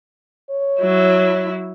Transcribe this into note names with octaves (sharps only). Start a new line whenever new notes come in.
C#5
F#3 E4